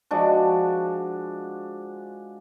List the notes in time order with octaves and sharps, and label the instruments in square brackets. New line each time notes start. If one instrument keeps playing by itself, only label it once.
[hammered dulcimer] F3 G#3 D4 F#4